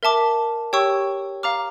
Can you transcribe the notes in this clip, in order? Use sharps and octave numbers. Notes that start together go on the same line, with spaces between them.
A#4 E5 A5 D6
G4 C#5 G5 C#6 E6
F5 A#5 D6 F6